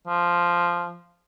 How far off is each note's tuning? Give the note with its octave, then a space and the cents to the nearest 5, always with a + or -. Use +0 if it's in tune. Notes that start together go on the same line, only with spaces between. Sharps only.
F3 -5